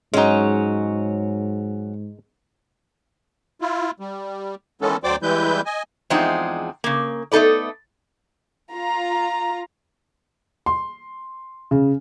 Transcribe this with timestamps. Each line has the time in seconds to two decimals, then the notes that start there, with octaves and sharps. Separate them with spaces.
0.14 G#2 F#3 G#3 C#4 D#4
3.61 E4 F4
4.00 G3
4.81 D#3 E3 G#3 B3 C#4 A4
5.04 D2 F#3 C5 D5 G5 D6
5.22 E3 G3 G#3 E4 B4 G6
5.66 D#5 G#5
6.10 E2 F3 G#3 C4 D4 D#4
6.84 C#3 A#3
7.32 A3 B3 D#4 A4 B4 D5
8.73 F4 A#5
10.66 C6
11.71 C#3